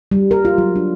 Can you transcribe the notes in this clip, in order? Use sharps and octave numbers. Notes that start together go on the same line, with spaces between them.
G3
A#4
F4
F#3
D4